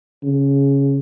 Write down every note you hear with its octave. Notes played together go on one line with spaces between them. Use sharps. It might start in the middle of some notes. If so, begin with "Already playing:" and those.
C#3